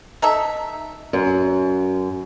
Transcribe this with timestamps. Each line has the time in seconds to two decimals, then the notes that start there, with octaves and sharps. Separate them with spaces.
0.22 D#4 A4 E5
1.13 F#2